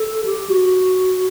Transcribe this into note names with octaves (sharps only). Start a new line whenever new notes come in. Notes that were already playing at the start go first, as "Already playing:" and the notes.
Already playing: A4
G4
F#4